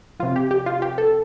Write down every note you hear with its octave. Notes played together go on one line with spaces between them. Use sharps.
C3 F3 F4
G4
G4
F4
G4
A4